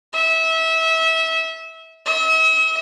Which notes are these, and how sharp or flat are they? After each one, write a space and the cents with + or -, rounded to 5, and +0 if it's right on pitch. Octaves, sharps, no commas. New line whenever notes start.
E5 -25
E5 -45